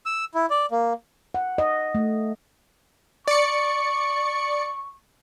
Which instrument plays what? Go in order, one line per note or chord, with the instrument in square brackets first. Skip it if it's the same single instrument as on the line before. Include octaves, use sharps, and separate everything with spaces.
[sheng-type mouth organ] E6
E4
D5
A#3
[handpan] F#5
D#5
A3
[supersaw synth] D5 C#7 [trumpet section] C#6